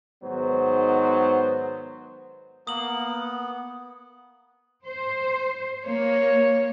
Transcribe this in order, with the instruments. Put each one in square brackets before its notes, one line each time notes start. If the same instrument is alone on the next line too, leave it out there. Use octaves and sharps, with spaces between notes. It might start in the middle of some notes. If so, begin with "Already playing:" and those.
[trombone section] G#2 D#3 F#3 B3 C5
[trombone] A#3 [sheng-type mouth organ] B3 [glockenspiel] D#6 F#7
[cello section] C5
[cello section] A#3 [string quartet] C#5